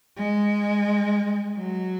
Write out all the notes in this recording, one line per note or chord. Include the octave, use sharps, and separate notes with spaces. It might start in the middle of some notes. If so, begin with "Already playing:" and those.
G#3
F#3